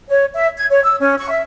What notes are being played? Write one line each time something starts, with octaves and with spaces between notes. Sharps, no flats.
C#5
E5
G#6
C#5
E6
C#4
C#6
E5